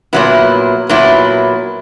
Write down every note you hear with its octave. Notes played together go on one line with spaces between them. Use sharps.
A#2 F#3 B3 E4
A#2 F#3 B3 E4